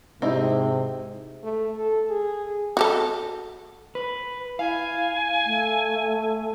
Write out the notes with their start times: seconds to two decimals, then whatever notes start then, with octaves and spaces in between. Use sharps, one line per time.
0.22 G#2 C3 C4 D#4 E4
1.44 A3
1.77 A4
2.10 G#4
2.77 F#4 G4 A4
3.95 B4
4.59 E4 F5 G#5
5.46 A3